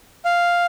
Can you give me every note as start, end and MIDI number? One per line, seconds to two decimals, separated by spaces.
0.25 0.66 77